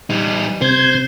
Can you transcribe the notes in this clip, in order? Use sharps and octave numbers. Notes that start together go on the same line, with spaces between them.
G3 D#4
C3 C5 G6 G#6